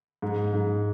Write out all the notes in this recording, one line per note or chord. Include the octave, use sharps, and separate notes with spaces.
G#2
G#2